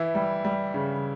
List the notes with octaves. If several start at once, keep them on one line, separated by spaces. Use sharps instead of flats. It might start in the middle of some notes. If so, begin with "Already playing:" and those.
Already playing: E3 E4
G3
G3
C#3